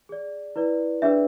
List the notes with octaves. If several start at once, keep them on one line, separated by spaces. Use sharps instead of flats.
G#4 D5
E4 B4 D5
D4 G#4 B4 D5 E5